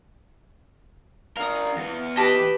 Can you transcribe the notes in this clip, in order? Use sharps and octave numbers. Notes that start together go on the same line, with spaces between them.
D4 A#4 F5 D#6
E2 B3
G4 B4 D#5 A5 B5